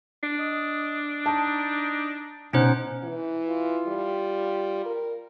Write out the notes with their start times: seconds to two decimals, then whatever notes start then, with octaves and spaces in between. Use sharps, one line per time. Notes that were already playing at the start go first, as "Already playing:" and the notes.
0.23 D4
0.39 D#5
1.26 D#4 A5
2.53 B2 C#4 D#4 C5 F#5
3.04 E3
3.49 F4
3.88 G3
4.86 A#4